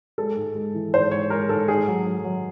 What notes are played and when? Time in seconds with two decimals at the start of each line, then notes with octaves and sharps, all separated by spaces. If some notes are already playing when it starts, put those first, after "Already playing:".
0.18 G#3 A4
0.36 G#2
0.55 G#3
0.74 E3
0.93 G#2 C5
1.11 G#2 C#5
1.30 G#3 A#4
1.49 G#2 A4
1.68 G#2 G#4
1.88 F#3
2.06 F#3
2.25 F#3